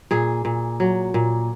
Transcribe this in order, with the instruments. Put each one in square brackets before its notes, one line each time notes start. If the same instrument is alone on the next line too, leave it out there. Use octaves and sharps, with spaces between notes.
[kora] A#2 G#4
A#2
F#3
A#2